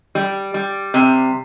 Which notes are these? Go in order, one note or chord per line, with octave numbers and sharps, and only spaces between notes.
G3
G3
C3